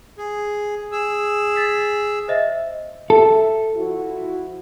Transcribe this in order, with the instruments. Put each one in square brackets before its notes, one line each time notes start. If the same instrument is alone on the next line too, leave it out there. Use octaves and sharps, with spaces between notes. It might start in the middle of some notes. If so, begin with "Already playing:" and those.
[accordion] G#4
G#4 E6
[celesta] A6 B6
C5 D#5 E5
[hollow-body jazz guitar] A4 [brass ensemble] E5
[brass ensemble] F3 E4 F#4